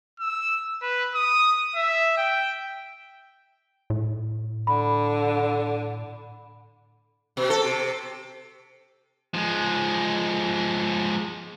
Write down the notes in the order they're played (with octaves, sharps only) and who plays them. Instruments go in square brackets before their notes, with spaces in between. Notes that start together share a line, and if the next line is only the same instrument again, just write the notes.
[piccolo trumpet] E6
B4
D#6
E5
G5
[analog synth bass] A2
[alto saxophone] D3 [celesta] B5
[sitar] B2
A4
C3
[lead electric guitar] F3 G#3